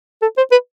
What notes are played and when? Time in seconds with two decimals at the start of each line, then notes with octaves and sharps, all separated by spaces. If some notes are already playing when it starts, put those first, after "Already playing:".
0.22 A4
0.37 C5
0.52 B4